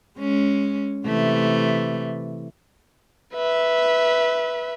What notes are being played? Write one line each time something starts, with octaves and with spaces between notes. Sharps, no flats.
G#3 C#4
C3 E3 A3
B4 E5